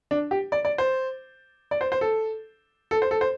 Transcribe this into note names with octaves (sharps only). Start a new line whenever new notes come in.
D4
G4
D5
D5
C5
D5
C5
C5
A4
A4
C5
A4
C5